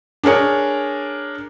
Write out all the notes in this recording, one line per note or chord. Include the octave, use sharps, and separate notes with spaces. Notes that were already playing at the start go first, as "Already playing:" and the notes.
D4 G#4 A#4 C#5